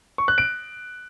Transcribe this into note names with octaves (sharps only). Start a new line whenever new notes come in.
C#6
F#6
D7